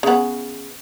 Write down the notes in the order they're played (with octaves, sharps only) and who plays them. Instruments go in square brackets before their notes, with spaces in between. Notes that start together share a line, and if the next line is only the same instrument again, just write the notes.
[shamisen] C#3 B3